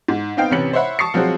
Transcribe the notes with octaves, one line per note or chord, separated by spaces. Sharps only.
G#2
B3 C4 D#4 F5 G5
A1 C3 C#4 B4 C#7 F#7
C5 C#5 E5 F#5 B5
A5 C#6 D#6 C7 C#7
F3 F#3 G#3 C4 F#4